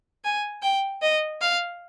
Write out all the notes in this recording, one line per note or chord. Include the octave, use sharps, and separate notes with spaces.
G#5
G5
D#5
F5